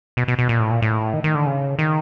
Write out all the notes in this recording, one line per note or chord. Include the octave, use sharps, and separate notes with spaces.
B2
B2
B2
A#2
A2
A#2
A2
D#3
D#3
D3
C#3
D#3